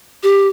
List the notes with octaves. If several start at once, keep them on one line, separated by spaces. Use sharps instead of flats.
G4